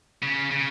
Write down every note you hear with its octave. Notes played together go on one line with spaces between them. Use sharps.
C#3
C#3